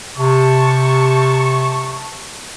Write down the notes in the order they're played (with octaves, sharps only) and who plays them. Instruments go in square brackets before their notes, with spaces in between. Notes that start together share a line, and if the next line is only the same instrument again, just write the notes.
[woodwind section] C3 [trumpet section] A5 C#6